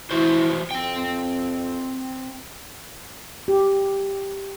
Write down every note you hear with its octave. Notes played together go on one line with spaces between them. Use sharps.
E3 E4 F#4 C5
F2 C4 G5
G4